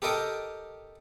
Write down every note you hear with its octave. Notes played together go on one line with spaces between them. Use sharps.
G4 A4 A#4 D#5 G5